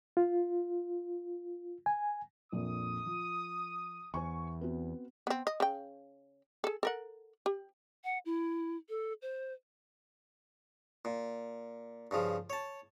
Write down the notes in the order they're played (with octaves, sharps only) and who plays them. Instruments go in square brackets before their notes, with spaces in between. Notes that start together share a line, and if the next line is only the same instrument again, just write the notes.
[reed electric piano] F4
G#5
[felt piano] A#1 F2 A#2 [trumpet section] D#6
[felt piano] F3
[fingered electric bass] E2 [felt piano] C5 G#5 C#6
[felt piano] B3 C4 F#4
[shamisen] B3 C4
D#5
C#3 G5
G#4 A4
A4 A#4 F#5
G4
[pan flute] F#5
E4
A4
C5
[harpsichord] A#2
G2 C#3 F3
C#5 A5